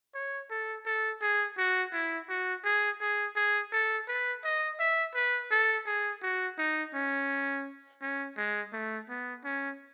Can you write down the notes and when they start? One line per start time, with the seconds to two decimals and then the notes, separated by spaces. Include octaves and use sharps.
0.15 C#5
0.51 A4
0.86 A4
1.22 G#4
1.58 F#4
1.93 E4
2.29 F#4
2.65 G#4
3.01 G#4
3.36 G#4
3.72 A4
4.08 B4
4.44 D#5
4.80 E5
5.15 B4
5.51 A4
5.87 G#4
6.22 F#4
6.58 D#4
6.94 C#4
8.02 C#4
8.37 G#3
8.73 A3
9.09 B3
9.45 C#4